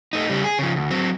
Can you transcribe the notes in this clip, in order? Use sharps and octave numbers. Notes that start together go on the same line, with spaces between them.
A3 D#4
C#3 G3
G#4
C#3 F3
D2
F#3 C4